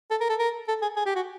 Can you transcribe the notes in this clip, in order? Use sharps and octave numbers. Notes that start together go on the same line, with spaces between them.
A4
A#4
A4
A#4
A4
G#4
G#4
G4
F#4